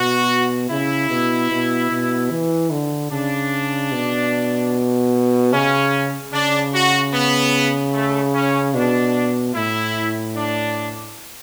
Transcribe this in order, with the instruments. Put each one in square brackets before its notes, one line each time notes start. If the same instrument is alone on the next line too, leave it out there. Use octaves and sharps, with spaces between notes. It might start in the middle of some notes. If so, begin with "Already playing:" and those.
Already playing: [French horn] B2 [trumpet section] F#4
[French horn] C#3 [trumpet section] E4
[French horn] B2
B2
B2
E3
D3
[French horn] C#3 [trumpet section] D4
[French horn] B2
[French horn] C#3 [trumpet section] C#4
[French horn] C#3 [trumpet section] D4
[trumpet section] F#4
B3
A3
C#4
[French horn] B2 [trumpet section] D4
[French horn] A2 [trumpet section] E4
[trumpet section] D4